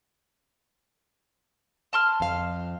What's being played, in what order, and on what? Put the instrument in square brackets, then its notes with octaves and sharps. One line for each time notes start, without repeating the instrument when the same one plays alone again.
[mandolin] A5 C6 F6
[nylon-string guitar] F2 F5